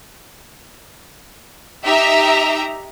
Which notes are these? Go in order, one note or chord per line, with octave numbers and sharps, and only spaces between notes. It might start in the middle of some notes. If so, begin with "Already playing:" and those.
D#4 G4 E5 A#5